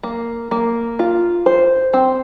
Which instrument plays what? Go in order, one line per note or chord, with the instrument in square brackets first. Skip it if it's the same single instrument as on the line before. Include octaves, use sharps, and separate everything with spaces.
[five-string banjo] A#3
A#3
F4
C5
C4